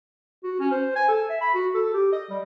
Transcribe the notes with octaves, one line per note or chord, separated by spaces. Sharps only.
F#4
C#4
C5
G#5
A4
E5
B5
F#4
A4
G4
D#5
G3